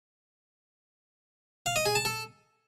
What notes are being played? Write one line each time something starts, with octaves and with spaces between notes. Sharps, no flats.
F5
D#5
G#4
A5
A4